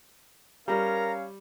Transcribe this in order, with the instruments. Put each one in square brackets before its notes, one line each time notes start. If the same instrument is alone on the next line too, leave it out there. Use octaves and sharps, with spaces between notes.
[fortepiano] G3 [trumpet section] C#4 C#5 F5 [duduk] A#4 [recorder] A#5